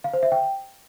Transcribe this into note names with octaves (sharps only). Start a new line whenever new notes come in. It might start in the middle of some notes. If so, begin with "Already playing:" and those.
F5
C5
E5
G5